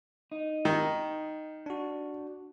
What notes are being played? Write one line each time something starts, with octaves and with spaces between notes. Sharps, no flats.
D#4
D#3
D4 F#4